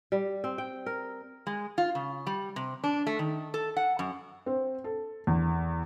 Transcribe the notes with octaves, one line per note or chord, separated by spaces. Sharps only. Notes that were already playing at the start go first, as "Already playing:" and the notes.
G3
C4
G5
A#4
G#3
F4
C#3
G3
C3
D4
A3
D#3
A4
F#5
F#2
C4
A4
E2